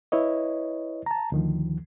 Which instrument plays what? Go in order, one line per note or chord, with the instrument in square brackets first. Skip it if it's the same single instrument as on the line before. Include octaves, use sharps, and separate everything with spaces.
[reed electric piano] E4 B4 C#5 D#5
A5 A#5
D2 D#3 F3